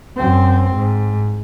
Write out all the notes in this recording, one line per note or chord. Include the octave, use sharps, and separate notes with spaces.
F#2 C4
G#2